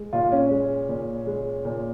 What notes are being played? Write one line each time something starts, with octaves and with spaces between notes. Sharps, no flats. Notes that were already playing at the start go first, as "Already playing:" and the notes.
Already playing: G#3
A#2 F4
C#4
G#3
A#2
G#3
A#2